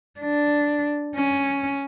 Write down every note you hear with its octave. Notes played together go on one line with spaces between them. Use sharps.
D4
C#4